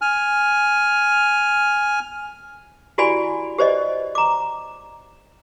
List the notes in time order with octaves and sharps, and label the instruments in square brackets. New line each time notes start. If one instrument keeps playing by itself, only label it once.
[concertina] G#5 F6
[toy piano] E4 F#4 G4 D5 G#5 B5
G4 C5 D5 D#5
A#5 D6